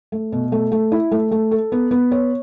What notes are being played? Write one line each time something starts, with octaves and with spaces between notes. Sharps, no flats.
A3
B2
A3
A3
E4
A3
A3
A4
B3
B3
C#5